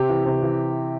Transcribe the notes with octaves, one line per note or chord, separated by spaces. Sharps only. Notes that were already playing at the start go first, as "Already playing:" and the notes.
Already playing: C3 G4
E3
C3
E3